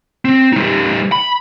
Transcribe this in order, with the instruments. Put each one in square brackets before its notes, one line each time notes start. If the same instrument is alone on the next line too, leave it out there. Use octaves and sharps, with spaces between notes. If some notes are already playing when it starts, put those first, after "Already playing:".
[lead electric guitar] C4
G3 D#4
B5